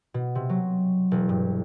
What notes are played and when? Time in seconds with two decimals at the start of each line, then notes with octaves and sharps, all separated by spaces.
0.14 B2
0.35 C3
0.49 F#3
1.11 E1
1.29 G2